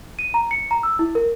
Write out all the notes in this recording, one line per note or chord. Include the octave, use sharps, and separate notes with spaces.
D#7
A#5
C#7
A#5
E6
E4
A#4